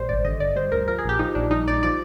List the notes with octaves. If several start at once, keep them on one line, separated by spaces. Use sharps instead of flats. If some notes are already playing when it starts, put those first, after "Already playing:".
Already playing: A#1 G3 C5
G#1 D5
D3 D#5
G1 D5
G3 C5
D2 A#4
F3 A#4
G#4
A#1 G4
F3 D#4
A#1 D4
G3 D#4
A#1 D5
F3 D5